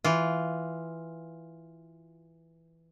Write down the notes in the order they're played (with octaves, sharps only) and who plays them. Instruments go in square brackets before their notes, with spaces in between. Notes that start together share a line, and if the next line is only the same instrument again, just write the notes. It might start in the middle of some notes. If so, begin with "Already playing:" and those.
[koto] E3 F4